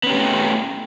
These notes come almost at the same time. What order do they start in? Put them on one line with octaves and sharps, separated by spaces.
B3 C#4 G4 A3